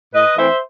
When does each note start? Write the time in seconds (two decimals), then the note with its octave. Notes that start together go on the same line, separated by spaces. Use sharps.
0.13 A2 B4 D#5
0.36 E3 A3 C4 C5 E5